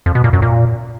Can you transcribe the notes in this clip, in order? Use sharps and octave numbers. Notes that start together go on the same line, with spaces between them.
F2
B2
A#2
F#2
A#2